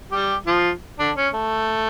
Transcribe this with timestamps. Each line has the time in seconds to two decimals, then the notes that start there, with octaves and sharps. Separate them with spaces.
0.12 G3 G4
0.46 F3 F4
0.99 D3 D4
1.17 C#4
1.34 A3